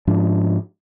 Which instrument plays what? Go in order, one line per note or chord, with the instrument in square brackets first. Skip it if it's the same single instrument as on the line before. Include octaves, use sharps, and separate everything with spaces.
[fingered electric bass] G#2 F3 D4